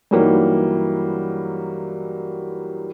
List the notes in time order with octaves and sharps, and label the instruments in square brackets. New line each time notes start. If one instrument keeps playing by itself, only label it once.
[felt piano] G2 E3 F#3 G3 A#3 D#4